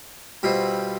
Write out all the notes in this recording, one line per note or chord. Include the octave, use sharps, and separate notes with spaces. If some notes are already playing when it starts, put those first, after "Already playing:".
B2 G3 C4 F4